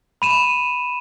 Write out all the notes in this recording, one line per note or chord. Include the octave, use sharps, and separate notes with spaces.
B5 D#7 E7